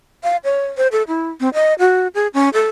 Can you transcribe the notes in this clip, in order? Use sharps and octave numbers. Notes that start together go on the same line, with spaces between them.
F5
C#5
C5
A4
E4
C4
D#5
F#4
G#4
C#4
A4